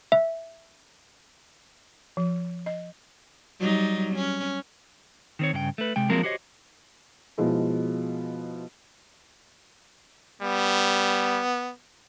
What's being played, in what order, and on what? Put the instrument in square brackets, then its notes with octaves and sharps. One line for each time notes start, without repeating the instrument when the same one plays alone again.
[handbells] E5
[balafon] F3
D#5
[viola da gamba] F#3 G3 D#4
C#4
[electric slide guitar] D#3 C4 C#5
G2 C#3 F#4 G5
A3 B4
C3 G#3 G5
F3 F#3 G#3 A#3 C4 A#4
F#4 G4 C5 C#5 D#5
[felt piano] B2 F3 G#3 E4
[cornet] G3 [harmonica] B3